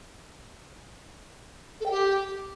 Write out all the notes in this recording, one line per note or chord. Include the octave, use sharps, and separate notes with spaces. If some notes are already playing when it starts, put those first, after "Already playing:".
A4
G5
G4